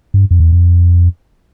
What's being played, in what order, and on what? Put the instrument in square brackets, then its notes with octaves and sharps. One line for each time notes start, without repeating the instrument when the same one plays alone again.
[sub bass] G2
F2
E2
F2